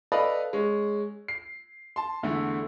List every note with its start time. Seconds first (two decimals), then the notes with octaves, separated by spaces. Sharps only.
0.12 A4 B4 D5 D#5 F5 B5
0.53 G#3 C#4
1.28 C7
1.96 A5 C6
2.23 E2 D3 A3 E4